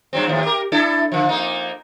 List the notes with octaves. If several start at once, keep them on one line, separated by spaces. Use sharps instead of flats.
G2 F#3 C4
D#2 A2 F3
G4 A#4
D4 E4 A4
D3 F3
F2 A#3 D#4